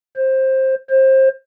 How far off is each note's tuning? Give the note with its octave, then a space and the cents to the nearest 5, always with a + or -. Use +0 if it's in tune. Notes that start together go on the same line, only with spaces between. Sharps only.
C5 +15
C5 +25